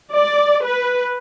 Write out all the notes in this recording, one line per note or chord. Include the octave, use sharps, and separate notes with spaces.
D5
B4